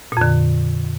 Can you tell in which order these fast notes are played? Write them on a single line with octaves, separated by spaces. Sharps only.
A#2 F2 D3